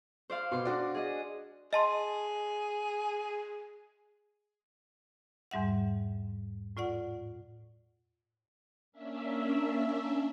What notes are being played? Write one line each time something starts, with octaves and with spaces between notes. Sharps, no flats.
C5 D5 F5
B2 C6 D6
D4 F#4 D5
G#4 D#5
G#4 D#5 A5 C6
E2 G#2 G3 E5 F#5
A2 F4 D5 F#5
A#3 C#4 D4 E5